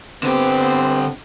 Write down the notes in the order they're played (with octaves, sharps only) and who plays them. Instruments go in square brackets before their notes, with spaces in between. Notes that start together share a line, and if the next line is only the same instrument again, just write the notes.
[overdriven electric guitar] D3 G4 [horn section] B3 C4